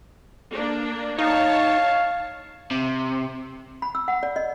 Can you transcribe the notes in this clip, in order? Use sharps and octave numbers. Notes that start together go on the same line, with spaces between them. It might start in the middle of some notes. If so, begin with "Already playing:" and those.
A#3 D4
D#4 C#5 F5 A5
C3
B5
E6
F#5
D5
D#5